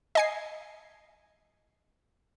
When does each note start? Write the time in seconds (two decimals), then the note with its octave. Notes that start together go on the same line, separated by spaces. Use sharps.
0.15 D#5 G#5 C7